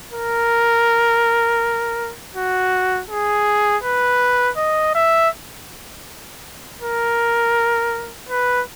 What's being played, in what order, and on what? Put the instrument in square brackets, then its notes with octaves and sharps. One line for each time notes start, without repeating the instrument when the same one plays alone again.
[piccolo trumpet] A#4
F#4
G#4
B4
D#5
E5
A#4
B4